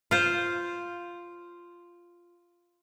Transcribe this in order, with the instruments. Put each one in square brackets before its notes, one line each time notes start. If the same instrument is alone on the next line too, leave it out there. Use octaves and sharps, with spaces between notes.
[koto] F4 C5